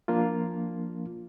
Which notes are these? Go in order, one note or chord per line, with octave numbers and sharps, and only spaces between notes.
F3 A#3 D4 F4